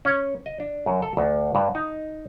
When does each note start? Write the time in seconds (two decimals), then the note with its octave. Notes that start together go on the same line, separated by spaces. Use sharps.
0.05 C#4
0.46 D#5
0.60 D4
0.86 F#2
1.02 A4
1.17 D2
1.55 G2
1.75 D#4